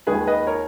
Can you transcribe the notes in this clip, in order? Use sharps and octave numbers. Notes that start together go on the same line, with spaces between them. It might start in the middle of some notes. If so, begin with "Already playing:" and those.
D#2 D#3 G#3 G#4 B4
B4 D#5
A#4 C#5